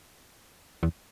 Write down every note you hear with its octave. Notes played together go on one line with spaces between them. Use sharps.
E2